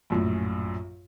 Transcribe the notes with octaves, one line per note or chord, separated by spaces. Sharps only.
A#1 F#2 A2